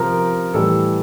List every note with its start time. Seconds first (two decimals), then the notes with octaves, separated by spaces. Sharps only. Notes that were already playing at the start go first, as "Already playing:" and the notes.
Already playing: C3 F3 A#4
0.54 A2 E3 G3 A4